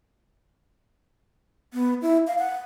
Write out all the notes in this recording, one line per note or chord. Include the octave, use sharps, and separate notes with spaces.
B3
E4
F5
F#5